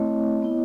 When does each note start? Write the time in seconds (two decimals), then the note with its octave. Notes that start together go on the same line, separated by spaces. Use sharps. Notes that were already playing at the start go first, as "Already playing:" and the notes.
Already playing: A3 C4 E4 C#5 D#5
0.42 B3 E4